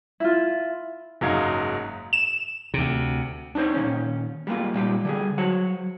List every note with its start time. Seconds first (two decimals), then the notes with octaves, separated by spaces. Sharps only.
0.20 E4 F4
1.21 F#1 G#2 F#3 D#4 F5 G#6
2.13 E7
2.74 D2 C3
3.55 D4 D#4 G#4 C5 C#5
3.74 A#2 D#3 C#4
4.47 G3 G#3 A#3 F4
4.74 A#2 G3 F4 G4
5.05 D3 G3 G#4
5.38 F#3 F#4 C5 C#5 F#5